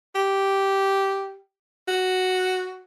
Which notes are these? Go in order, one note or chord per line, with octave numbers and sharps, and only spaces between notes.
G4
F#4